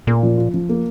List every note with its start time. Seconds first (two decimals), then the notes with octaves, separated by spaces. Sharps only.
0.07 A#2 A#3
0.23 F3
0.38 F4
0.54 F3
0.69 A#3